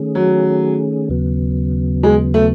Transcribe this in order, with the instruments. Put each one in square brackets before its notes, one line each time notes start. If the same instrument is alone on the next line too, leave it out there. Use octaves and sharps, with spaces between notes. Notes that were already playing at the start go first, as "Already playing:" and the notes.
Already playing: [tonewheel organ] D#3 A3 C#4 G#4
[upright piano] F#3
[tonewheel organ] D#2 C#3 F#3 B3
[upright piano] G#3
A3